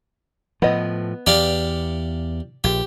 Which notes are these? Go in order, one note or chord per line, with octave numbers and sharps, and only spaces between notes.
A2 F3 B3 D#5
E2 G4 D5 F5
A#1 G4